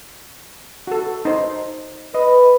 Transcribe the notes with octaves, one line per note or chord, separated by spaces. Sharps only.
F#4 A4
D#4 C5
B4 D#5